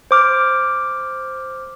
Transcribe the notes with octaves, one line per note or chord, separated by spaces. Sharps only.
C5 D6 F6